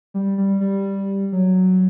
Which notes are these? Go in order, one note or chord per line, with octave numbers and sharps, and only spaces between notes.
G3
G3
G3
F#3